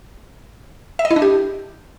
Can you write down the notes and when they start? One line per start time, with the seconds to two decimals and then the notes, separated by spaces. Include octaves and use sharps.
0.99 E5
1.05 D#5
1.11 E4
1.16 D4
1.22 G4